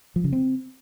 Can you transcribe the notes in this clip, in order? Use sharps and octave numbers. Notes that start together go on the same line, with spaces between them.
F3
C#3
C4